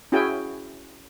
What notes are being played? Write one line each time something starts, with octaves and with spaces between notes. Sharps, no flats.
C#4 E4 F#4 G#4 G5 G#5